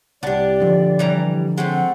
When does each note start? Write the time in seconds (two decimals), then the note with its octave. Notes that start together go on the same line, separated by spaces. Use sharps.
0.23 C2 D4 G4 D5 F#5 A5
0.61 D3 F3
0.99 E3 G3 A#5
1.58 G#3 A3 C4 F#5